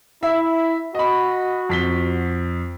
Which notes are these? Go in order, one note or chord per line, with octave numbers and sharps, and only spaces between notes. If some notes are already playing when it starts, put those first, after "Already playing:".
E4 E5
F#4 D#5 B5
F2 B6 G7